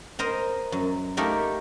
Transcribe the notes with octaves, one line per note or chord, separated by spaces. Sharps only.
A#4 C5 D#5 A#5
F#2
A3 A#3 D#4 G4 A4 A#4